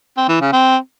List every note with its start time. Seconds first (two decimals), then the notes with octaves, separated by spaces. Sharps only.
0.17 C4
0.29 E3
0.41 C#3
0.53 C4